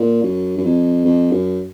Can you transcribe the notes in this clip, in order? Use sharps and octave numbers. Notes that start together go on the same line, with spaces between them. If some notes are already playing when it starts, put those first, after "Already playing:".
Already playing: A#2
F#2
F#2
F2
F2
F#2